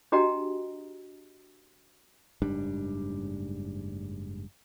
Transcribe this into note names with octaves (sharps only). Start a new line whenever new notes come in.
D4 F#4 G4 D#5 G5 A#5
F#1 G#2 G3 D4